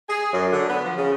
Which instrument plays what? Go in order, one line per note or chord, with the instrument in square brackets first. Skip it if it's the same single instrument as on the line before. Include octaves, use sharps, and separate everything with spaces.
[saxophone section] G#4
F#2
D3
B3
F3
C#3